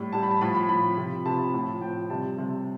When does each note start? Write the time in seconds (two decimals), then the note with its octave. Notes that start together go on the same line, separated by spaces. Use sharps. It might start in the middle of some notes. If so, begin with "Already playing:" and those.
Already playing: A2 G3
0.13 A2 G3 A5
0.23 B5
0.31 A5
0.41 A2 F3 B5
0.55 B5
0.69 A2 F3 B5
0.97 C3 F3
1.25 C3 F3 A5
1.54 A2 F3
1.81 A2 F3 G5
2.10 C3 G3 A5
2.38 C3 G3